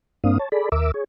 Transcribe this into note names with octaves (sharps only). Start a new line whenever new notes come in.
G2 A#3 C4 D4 F5 D#6
C#5 A5
G#4 A4 D5 B5
D#2 A#4 E5 D6 E6
G#4 C#5